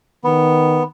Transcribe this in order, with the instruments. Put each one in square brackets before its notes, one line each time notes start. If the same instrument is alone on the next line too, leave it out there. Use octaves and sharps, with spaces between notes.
[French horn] D#3 [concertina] B3